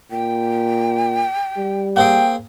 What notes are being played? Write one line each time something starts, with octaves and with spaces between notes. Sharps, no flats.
A#2 G5
G3
A#3 C4 G#4 G5